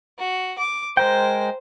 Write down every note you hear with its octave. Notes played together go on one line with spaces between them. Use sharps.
F#4
D6
G#3 A#4 C5 G5